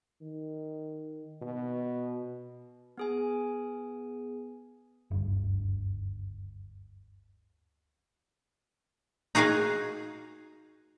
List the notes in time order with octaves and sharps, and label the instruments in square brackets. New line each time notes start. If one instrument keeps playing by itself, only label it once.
[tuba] D#3
B2
[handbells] B3 G#4 G#5
[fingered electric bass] F#1 D2 G2 D3
[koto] D#4 F#4 G#4 F5 G#5